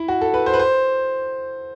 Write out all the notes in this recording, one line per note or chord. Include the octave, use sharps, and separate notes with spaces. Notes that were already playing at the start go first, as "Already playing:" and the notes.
Already playing: E4
F#4
A4
B4
C5
B4
C5